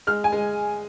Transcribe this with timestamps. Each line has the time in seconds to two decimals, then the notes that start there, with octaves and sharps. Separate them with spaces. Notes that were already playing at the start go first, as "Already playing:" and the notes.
0.07 G#3 F6
0.24 G#5
0.32 G#3